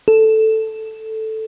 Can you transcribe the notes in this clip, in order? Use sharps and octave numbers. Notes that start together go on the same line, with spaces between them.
A4